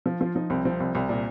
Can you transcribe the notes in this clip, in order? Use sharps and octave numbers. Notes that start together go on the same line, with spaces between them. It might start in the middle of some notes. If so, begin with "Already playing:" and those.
F3
F3 F4
F3 D#4
C2 C4
F3 C4
C2
C2
A#2